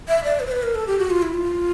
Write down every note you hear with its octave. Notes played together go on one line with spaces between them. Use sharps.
E5
D5
B4
C5
B4
A#4
A4
G4
F#4
F4
E4
F4